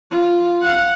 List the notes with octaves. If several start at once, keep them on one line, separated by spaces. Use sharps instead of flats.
F4
F5 F#5